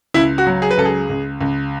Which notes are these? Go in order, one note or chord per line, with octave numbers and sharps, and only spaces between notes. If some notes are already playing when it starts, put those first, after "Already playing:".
C#2 E4
F#4
F#3
G#4
B4
C#2 A4
G#4
C#2
C#2